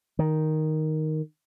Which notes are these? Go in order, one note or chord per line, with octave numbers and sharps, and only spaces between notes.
D#3